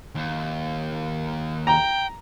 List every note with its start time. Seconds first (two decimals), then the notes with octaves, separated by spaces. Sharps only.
0.15 D#2
1.67 G5 A#5